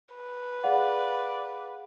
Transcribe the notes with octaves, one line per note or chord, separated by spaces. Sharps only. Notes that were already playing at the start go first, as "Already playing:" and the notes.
B4
G#4 D5 F5 F#5